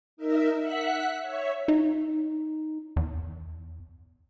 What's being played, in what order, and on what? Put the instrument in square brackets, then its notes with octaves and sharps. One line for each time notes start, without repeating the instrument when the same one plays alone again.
[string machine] D#4 A#4 E5
E5 F#5 F#6 B6
C#5 E5
[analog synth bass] D#4
E2